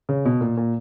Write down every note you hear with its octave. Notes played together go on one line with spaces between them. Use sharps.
C#3
B2
A#2
A#2